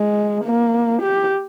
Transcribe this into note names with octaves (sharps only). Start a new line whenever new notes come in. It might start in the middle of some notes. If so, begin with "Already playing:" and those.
Already playing: G#3
A#3
G4